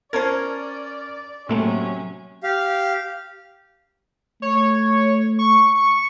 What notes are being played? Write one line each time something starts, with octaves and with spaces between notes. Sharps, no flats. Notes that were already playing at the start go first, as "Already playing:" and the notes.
C#4 A#4 C5 D5 A5 G#6
A2 C3 F#3 A3 A#3 C#4
G4 F5
A3 C#5
C#6